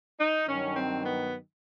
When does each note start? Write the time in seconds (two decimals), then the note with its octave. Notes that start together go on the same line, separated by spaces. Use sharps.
0.19 D#4
0.47 G2 D#3 F#3 C#4
0.76 C4
1.04 B3